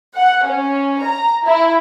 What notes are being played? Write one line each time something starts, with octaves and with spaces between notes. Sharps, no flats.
F#5
C#4
A#5
E4